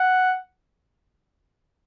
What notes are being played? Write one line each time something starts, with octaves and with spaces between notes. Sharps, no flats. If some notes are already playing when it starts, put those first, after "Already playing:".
Already playing: F#5